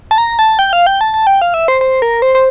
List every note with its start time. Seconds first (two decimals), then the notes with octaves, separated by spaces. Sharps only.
0.11 A5
0.18 A#5
0.39 A5
0.59 G5
0.73 F5
0.86 G5
1.01 A5
1.14 A5
1.27 G5
1.41 F5
1.54 E5
1.68 C5
1.81 C5
2.02 A#4
2.22 C5
2.35 C5